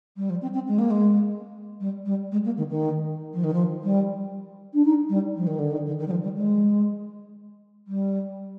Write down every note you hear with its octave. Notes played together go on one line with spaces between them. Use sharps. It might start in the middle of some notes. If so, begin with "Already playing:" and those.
G3
F3
C4
C4
G#3
A#3
G#3
G3
G3
G#3
A#3
D#3
D#3
F3
D#3
F3
G3
D4
D#4
G3
F3
D#3
D3
D#3
D3
D#3
G3
F3
G3
G#3
G3